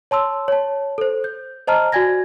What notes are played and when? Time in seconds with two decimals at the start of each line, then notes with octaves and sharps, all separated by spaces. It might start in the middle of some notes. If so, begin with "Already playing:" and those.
0.11 C#5 A5 C6 E6
0.48 C#5 A5
0.98 A4 C5
1.24 G6
1.68 C5 D#5 A5 A#5 F6
1.92 F#4 D5 G#5 G#6 A#6